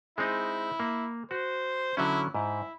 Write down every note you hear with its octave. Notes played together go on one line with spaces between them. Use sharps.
G#3 C4 D#4 E4
A#3
F#4 C5
D3 F#3 C#4 E4
G#2 E4